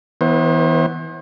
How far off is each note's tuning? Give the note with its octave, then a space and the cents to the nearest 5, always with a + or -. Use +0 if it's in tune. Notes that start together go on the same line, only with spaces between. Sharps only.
E3 -30 B3 +0 C5 +40